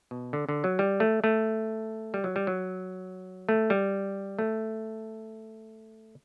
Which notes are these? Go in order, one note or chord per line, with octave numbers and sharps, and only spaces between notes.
B2
D3
D3
F#3
G3
A3
A3
G3
F#3
G3
F#3
A3
G3
A3